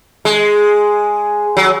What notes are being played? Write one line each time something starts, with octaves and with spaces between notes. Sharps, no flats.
G#3
F#3